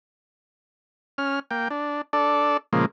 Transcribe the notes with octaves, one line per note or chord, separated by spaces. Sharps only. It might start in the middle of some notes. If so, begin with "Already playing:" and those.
C#4 F6
A#3 G5
D4
D4 A4 D5
A#2 C#3 F3 G#3 A#3